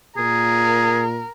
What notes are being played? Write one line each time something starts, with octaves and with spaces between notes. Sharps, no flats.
A#2 G#4 A#4